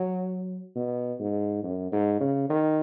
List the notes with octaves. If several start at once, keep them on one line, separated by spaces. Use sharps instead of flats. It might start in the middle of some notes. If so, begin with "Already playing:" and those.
Already playing: F#3
B2
G#2
F#2
G#2
C#3
D#3